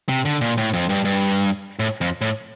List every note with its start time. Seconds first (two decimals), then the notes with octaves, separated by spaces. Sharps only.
0.09 C3
0.25 D3
0.41 A#2
0.58 A2
0.73 F2
0.89 G2
1.05 G2
1.79 A2
2.01 F2
2.21 A2